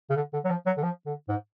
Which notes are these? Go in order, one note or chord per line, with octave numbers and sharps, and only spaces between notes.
C#3
D3
D3
F#3
F3
F#3
D3
F3
D3
G#2